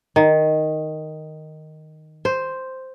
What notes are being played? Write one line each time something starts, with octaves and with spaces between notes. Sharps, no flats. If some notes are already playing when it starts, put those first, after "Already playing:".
D#3
C5